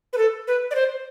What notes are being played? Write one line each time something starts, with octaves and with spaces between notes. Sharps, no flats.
B4
A4
B4
D5
C5